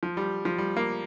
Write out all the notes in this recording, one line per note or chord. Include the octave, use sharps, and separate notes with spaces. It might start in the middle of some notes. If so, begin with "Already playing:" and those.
F3
G3
F3
G3
A#3